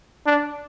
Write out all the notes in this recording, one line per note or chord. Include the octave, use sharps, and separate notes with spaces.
D4